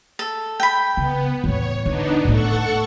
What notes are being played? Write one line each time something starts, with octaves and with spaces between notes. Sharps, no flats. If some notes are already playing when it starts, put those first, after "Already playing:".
A4
G5 B5
C#3 B3
E2 A2 C#5
D3 B3 D4 D#4
A2 A3 A4 F#5 C#6